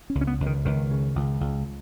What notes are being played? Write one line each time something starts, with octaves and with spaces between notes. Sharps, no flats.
C#4
C#2
C#4
B3
C#2
D#3
C#2 D#3
C#3
C#2
C#2